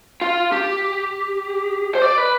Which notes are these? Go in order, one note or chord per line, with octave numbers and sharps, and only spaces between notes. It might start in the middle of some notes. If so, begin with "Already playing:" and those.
F4
G4
C5
D5
B4